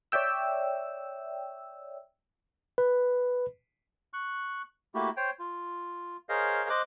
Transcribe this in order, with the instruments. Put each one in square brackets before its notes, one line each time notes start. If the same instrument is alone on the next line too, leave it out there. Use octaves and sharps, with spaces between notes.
[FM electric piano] C#5 D5 E5 G5 E6
[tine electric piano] B4
[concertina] C#6 F#6
A3 A#3 E4 F#4 G4
C5 C#5 G5
F4
G#4 A#4 C5 C#5 D#5 F5
C5 D#5 D6 F#6